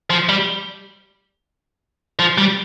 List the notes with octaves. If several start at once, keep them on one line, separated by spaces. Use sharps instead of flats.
F3
G3
F3
G3